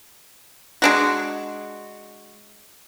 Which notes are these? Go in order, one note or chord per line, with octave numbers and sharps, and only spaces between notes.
G#3 D4 F#4